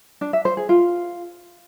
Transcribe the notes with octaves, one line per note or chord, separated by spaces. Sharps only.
D4
E5
C5
G#4
F4